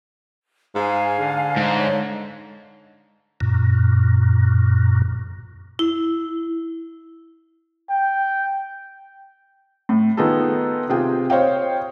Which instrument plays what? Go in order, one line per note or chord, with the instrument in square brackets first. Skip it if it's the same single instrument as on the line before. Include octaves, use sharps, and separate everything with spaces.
[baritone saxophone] G#2 [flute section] F5 G#5
[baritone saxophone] D3
[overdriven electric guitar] G#2
[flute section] C#5
[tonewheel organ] F#2 A#2
[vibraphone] E4
[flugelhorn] G5
[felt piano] A2
D#3 B3 D#4 F4 G#4 A4
C3 F4 G#4 G5
C5 C#5 D#5 F5 G5